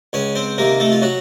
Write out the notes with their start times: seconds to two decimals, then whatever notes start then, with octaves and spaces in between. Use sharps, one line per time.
0.13 C#2 C#4 C#5
0.35 C4 C5
0.58 C3 D#3 A#3 A#4
0.80 A3 A4
0.92 F4
1.02 F#3 F#4